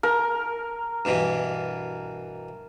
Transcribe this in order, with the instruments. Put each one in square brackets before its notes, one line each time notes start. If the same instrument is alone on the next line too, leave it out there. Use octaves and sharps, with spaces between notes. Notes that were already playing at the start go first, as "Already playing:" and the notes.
[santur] A#4
[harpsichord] G2 B2 E3